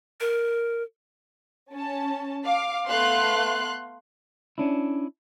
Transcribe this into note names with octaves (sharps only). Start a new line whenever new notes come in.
A#4
C#4 A5
F5 D6
A3 B3 F5 C6 F#6
C#4 D4 E4